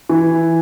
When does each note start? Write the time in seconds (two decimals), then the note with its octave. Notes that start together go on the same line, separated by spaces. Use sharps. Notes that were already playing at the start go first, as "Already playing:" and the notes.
0.09 E3